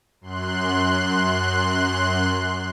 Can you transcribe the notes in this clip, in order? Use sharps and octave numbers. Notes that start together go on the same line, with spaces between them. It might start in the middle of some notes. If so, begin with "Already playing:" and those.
F#2 C6 F#6